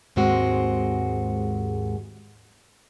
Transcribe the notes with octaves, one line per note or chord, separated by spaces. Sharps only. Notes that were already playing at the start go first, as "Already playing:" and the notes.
D#2 G#2 G#3 C4 F#4